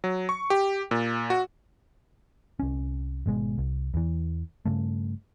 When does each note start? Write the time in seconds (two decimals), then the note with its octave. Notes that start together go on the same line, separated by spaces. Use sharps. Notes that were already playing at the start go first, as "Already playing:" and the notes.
0.04 F#3
0.29 C#6
0.50 G4
0.91 A#2
1.30 F#4
2.60 C2 C#4
3.26 G#1 B2 G#3
3.58 C2
3.94 E2 E3
4.65 G2 C#3 A3